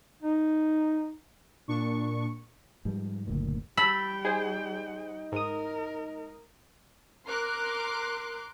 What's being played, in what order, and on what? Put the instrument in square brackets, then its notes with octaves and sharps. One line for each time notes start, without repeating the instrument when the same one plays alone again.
[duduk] D#4
[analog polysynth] A#2 D4 C#6
[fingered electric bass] G#2 F3 G3
F#1 D2 A#2
[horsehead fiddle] G3 G5 [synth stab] A5 E6 [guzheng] B5
[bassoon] D#4 [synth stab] G#4 C5
[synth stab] G#2 D#6 [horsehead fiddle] A#4
[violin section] A#4 C6 D6 F#6